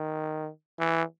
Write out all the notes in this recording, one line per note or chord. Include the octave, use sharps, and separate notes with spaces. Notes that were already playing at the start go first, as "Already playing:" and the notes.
Already playing: D#3
E3